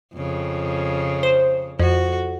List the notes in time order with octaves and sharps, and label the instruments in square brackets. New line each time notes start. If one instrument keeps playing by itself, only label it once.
[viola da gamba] F2 C#3
[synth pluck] C5
[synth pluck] F2 [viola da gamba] F#4